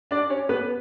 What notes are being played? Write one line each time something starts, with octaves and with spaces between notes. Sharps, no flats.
D4 D5
C#4 C#5
B3 B4